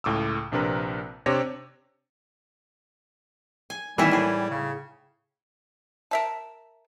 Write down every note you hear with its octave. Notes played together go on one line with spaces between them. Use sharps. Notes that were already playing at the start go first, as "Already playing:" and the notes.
C#2 A2 D6 E6
A#1 C3 D4 A#4 B4
C3 C4 D4 G4 C#5 A#6
G#5
D#3 E3 G3 G#3 E4
A2 G#4
C#3
A#4 E5 A5